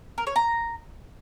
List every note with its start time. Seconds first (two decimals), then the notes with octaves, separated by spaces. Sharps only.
0.18 A#4
0.27 C#5
0.36 A#5